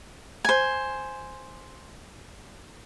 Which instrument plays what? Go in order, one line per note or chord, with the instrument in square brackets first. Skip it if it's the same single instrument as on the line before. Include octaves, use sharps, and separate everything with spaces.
[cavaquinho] C5 G#5